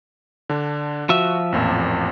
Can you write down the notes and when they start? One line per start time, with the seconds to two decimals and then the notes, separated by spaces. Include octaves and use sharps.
0.49 D3 D4
1.09 F3 F#4 E5
1.52 A1 F2 A#2